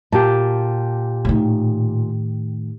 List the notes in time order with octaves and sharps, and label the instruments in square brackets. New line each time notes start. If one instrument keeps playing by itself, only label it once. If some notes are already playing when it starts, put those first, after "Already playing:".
[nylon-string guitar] A#2 [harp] G4 A5
[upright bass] A2 D#3